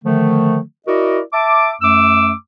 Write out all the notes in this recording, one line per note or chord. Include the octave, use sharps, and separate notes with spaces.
D3 D#3 F3 A3
E4 F#4 A#4 D5 D#5
E5 A5 D6
F#2 A3 D6 E6